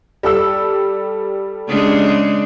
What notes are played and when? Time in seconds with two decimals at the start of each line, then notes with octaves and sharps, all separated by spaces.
0.23 G3 A4 E6
1.69 C#3 G#3 D4